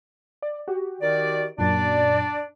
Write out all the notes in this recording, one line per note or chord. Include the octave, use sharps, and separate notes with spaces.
D5
F#4 G4
D#3 D5
F#2 A#2 D4 D5